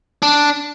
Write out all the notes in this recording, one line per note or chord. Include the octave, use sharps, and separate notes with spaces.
D4